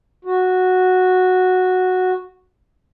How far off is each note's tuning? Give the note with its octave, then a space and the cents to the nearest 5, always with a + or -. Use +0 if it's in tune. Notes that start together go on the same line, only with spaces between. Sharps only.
F#4 -5